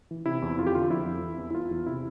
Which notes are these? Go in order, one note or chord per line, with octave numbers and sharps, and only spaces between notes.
E3
C3 E4
E2
F2 F4
G4
D3 F4
F3 E4
F2
E3
E2
E4
E2 F4
E2
C3 E4